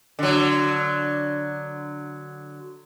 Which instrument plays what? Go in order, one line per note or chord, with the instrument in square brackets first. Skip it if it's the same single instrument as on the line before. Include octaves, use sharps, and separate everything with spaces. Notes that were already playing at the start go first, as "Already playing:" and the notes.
[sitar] D3 F#3